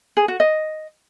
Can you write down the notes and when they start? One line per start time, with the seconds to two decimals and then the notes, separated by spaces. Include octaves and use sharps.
0.17 G#4
0.28 F#4
0.40 D#5